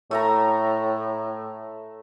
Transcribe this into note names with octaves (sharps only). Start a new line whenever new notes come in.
A2 A3 E5 A#5